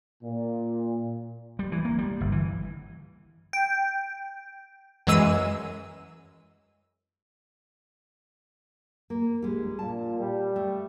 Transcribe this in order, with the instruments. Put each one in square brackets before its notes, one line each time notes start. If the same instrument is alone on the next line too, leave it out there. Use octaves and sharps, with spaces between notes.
[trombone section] A#2
[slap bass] G3
E3
A#3
G3
G1
E3
[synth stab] G5
[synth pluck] F#2 E3 G#3 E6 D#7
[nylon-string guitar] A#3
[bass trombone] A#1 [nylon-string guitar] G3 G#3
[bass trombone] A#2 [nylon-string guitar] A5
[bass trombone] G3
[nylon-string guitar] A3